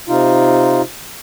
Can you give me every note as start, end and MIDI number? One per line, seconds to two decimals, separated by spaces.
0.08 0.81 48
0.08 0.81 63
0.08 0.81 65